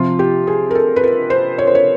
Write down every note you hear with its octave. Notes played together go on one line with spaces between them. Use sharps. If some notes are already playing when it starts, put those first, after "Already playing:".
Already playing: C3 F3 F4
G4
G#4
A#4
A4
B4
A#4
C5
C#5
C5
C#5